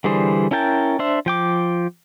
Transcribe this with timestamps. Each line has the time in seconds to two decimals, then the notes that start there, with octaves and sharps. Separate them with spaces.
0.04 D3 E3 G3 G#4 C5
0.51 C#4 E4 A#4 G5 A5
0.99 D4 C5 E5
1.26 F3 G5 D6